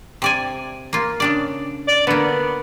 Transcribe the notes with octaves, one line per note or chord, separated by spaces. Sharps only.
C3 D5 G#5
A#3 F4
C#3 D4 D5
D5
D3 A#3 B3